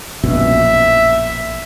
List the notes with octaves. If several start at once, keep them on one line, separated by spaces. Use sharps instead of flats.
A#1 F#2 B2 E5